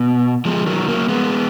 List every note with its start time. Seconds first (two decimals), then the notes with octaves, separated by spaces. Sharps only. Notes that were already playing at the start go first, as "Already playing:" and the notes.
Already playing: B2
0.45 F3 G#3
0.66 D#3 F#3
0.88 F#3 A#3
1.09 G#3 B3